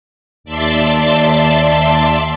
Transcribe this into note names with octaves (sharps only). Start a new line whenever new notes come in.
D#2 D5 E5 A5 C6